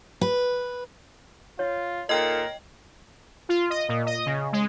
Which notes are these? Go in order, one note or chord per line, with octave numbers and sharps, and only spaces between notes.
B4
F4 C#5
A#2 D#4 A4 A#4 D#5 G5
F4
D#5
A#2
D#5
C#3
G#3